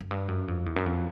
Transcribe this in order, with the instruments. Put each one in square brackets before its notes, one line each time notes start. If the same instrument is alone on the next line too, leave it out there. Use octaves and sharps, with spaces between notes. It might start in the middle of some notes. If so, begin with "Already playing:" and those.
[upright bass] F#2
G2
F#2
F2
E2
F#2
F2